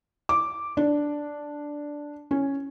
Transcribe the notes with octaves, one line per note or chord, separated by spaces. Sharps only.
D6
D4
C#4